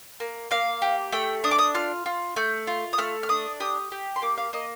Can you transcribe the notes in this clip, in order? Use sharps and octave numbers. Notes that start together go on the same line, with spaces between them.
A#3
A#3 F5
G4
A3 G5
D4 D#6
D6
D#6
F4 F6
F4
A3 G6
F4
D#6
A3 F6
F6
D4 D#6
G4 D#6
G4
C6
A#3 D6
F5
A#3 D#5